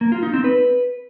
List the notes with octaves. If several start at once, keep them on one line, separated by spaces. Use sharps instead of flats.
A#3
F4
D#4
C4
B4